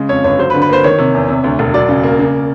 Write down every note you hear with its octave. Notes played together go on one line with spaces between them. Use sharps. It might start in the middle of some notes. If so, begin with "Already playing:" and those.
Already playing: C#3 G#3
F2 C#5
G1 C#5
F#3 C5
B4
D3
B4
A#3 C5
D#3 C#5
C3
E2
C3
D2
E1
F#3 D5
C#3
A#3
C#3